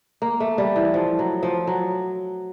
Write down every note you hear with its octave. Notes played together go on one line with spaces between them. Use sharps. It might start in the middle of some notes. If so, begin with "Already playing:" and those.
A#3
A3
G3
E3
F3
F#3
F3
F#3